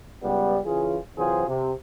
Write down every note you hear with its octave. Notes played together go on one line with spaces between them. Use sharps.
C#2 G3 B3
C#3 E3 F4 G#4
C3 E3 F#3 F4 G#4 C5
C3